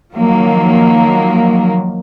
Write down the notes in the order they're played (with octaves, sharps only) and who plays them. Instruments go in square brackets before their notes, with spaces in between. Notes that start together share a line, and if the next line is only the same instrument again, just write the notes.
[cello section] D#3 F3 F#3 A#3